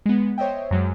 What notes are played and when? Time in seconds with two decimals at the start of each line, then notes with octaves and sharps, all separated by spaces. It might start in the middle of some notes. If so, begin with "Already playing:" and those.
0.06 G#3 B3
0.38 C5 C#5 D#5 E5 G5
0.71 F#2 F#3 G#3